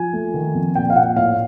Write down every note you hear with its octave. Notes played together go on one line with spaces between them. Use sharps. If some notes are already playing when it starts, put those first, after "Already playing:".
Already playing: F3 G#5
A3
D#3
F2
A#2 G5
F5
A#2 F#5
A2 F5